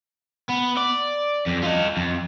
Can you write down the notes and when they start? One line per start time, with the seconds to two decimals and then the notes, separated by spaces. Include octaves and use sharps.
0.50 B3
0.77 D5
1.47 F2
1.64 F4 D#5
1.97 F2